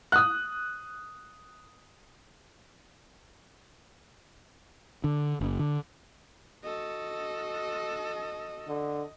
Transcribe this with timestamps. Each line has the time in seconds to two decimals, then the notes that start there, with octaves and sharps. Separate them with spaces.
0.12 D#6 F#6
5.04 D3
5.41 F#1
5.59 D3
6.63 F#4 A4 D#5
8.68 D3